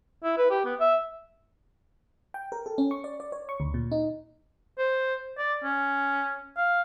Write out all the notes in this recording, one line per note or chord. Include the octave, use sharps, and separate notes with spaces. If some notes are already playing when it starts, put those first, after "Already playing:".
E4
B4
G4
B3
E5
G5
A#4
A4
C#4
C#6
D5
D5
C#5
C#6
D2
A#2
D#4
C5
D5
C#4
F5